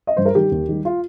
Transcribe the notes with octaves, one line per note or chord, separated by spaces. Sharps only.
D#5
G2 C5
A#4
D#3 G3 G4
D#2
D#3 G3
F4